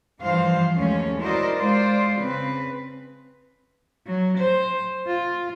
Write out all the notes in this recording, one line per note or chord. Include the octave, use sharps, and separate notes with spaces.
G2 E3 F3 C5 F5
D#2 G#3 A3 C#4
E4 F#4 A#4 C5 D5 D#5
G#3 F4 C5 D5
C#3 C4 B4
F#3
C5
F4